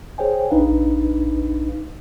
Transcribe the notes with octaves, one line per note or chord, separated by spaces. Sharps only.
G#4 C5 C#5 G5 G#5
A#1 D4 D#4 B4 F5